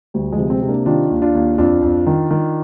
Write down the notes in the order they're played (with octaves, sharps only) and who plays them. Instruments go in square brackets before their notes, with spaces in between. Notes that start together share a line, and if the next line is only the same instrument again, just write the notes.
[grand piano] D2 G3
F3 G#3
C3
G#3 C4
C3
A#3 D4
D#3 D4 F4
D#2
D4 F4
D#2
F2 D4 F4
F2
D#3
D#3